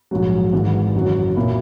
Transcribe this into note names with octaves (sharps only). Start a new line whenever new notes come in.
A#1 G#2 F#3
G#1 G#2 E3
F#1 F#2 D#3 F#3
B1 A#2 A#3 E4